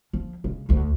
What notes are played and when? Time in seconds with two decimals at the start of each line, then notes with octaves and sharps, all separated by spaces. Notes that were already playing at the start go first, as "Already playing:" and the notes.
0.13 F3
0.44 C#3 G#3
0.69 D2 A3